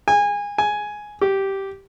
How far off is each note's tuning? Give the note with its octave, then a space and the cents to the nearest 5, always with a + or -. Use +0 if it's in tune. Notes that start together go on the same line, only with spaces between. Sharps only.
G#5 -25
G#5 +5
G4 -10